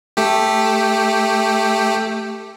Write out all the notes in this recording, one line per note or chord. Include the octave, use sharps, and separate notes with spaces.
A3 G4